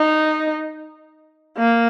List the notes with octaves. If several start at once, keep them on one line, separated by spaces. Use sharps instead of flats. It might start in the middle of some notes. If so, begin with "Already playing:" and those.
Already playing: D#4
A#3